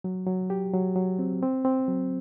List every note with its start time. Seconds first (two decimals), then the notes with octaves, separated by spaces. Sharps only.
0.04 F#3
0.26 F#3
0.50 G4
0.74 F#3
0.96 F#3
1.19 C4
1.43 C4
1.65 C4
1.88 F#3